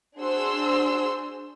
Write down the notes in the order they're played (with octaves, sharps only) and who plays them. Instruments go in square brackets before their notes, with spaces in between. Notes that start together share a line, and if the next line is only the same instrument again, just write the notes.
[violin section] D4 F#4 G#4 C5 C6 E6